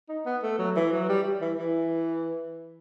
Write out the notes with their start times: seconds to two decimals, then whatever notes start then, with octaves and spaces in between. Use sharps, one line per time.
0.09 D#4
0.25 B3
0.43 A3
0.59 F#3
0.76 E3
0.92 F#3
1.09 G3
1.41 E3
1.58 E3